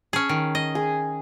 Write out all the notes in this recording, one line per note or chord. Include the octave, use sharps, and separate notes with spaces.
C#4 G#4 A5
D#3
D#5
G#4